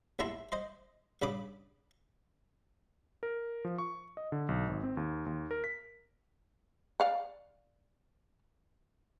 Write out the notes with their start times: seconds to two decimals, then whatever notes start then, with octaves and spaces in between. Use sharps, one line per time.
0.19 D#2 A3 E4 E5 A#5 C6
0.52 C5 D#5 C6
1.22 G2 C#3 B5 D6 D#6
3.23 A#4
3.65 F3
3.78 C#6
4.17 D#5
4.32 D3
4.49 B1
4.67 G#1
4.83 C4
4.97 D#2
5.26 D#2
5.51 A#4
5.64 B6
7.00 D5 F5 F#5